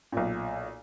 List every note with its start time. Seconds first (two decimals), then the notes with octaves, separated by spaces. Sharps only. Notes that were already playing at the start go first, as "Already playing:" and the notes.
0.12 B1 A#2